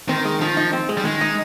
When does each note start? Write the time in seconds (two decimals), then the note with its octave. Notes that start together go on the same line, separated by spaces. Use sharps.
0.08 D#3 C4
0.25 G#3
0.41 D#3 F3
0.57 D#4
0.73 C4
0.89 G#3
0.97 G3
1.05 D#3 G#3
1.21 D#4